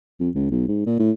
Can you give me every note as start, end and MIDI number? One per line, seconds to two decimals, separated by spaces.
0.20 0.29 41
0.35 0.47 37
0.51 0.64 35
0.69 0.82 44
0.86 0.99 46
0.99 1.11 45